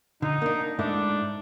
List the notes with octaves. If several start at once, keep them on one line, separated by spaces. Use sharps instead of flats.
D3 D#4
A#3 D4
G#2 A3 D4 E4